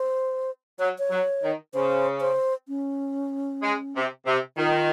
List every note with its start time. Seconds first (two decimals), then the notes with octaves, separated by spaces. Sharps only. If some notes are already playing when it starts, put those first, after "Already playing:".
Already playing: C5
0.79 F#3 C#5
0.99 C#5
1.10 F#3
1.43 D#3
1.74 C#3 C5
2.21 C5
2.68 C#4
3.63 G#3
3.95 C3
4.26 C3
4.57 D#3 F4